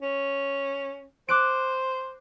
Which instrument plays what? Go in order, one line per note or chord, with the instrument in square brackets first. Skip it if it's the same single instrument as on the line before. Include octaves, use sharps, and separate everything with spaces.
[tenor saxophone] C#4
[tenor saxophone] C5 [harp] D6 F#6 D7